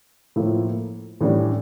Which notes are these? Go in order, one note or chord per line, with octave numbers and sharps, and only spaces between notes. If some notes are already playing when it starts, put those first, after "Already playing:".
A2 F3 A#3 E4
A2 E3 G3 D4